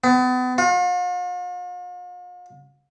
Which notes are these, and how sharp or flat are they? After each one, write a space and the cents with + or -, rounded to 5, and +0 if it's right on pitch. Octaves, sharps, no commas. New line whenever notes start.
B3 +35
F4 +45